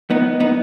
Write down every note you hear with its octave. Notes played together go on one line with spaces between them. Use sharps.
B3 D#4
B3 D#4